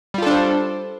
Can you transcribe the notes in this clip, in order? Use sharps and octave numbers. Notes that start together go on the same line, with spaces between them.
G3 D4 F4 A4 C5